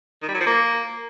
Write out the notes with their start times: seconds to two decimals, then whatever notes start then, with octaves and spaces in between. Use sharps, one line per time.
0.22 D#3
0.28 G3
0.35 F#3
0.41 F3
0.47 A#3